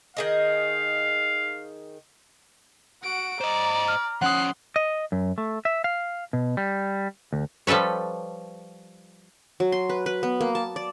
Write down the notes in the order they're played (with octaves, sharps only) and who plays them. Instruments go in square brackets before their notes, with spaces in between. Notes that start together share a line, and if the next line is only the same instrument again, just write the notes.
[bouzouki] D#3 G#4 D#5 [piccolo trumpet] F5
[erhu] F#4 [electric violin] F#5 D7
[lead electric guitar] C5 D#5 [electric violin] D5 [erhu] A#5
[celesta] F6
[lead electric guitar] F3 C#4 [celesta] F#5 D#6 [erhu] C6 [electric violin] F#6 C7
[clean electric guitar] D#5
F#2
A3
E5
F5
B2
G3
D2
[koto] F3 G3 A4 B4 C#5
[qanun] F#3
C6
B4
B4
B3
A#3
A5
D5